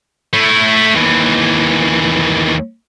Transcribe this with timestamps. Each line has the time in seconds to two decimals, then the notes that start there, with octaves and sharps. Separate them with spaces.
0.33 A3 E4
0.95 D#2 E3